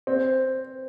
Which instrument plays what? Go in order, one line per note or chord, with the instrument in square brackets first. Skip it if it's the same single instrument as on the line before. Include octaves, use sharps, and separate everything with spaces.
[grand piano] C4